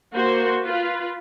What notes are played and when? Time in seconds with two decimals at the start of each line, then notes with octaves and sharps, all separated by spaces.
0.13 A#3 F#4 C5
0.64 F4 B4